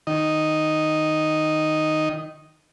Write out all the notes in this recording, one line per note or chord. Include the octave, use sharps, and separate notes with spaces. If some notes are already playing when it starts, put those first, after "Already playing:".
D#3 D#5